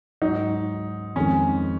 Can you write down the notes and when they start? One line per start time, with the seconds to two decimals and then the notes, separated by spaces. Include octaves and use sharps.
0.22 G#2 F#3 D#4
1.16 F2 D#3 G#3 C#4